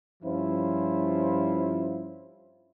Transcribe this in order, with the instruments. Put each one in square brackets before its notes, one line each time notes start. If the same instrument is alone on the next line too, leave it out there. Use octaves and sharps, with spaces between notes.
[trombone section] G2 F3 C#4 E4 F4 C5